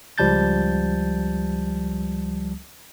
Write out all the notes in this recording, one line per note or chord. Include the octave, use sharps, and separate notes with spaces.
C#2 F3 G3 A5 G6 A6